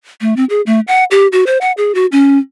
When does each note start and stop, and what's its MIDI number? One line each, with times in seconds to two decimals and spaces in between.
0.21 0.36 57
0.36 0.45 60
0.50 0.61 68
0.66 0.80 57
0.88 1.04 78
1.11 1.27 67
1.32 1.44 66
1.47 1.58 72
1.61 1.72 78
1.77 1.94 68
1.95 2.06 66
2.12 2.38 61